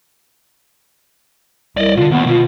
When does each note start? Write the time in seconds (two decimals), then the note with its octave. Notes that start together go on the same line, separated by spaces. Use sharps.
1.77 C2 D5 D#5
1.96 B2 D3 F4
2.11 D#2 B3
2.27 B2 F4